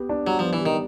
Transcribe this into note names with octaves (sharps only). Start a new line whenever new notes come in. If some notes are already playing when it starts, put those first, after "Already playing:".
Already playing: B3 G4
D4
F#3 G3
F3 B3
E3
D#3 G4